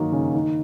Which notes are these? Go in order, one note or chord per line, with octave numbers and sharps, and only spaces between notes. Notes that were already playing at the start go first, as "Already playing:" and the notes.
Already playing: D#3 F#3 A#3
C#3
D#3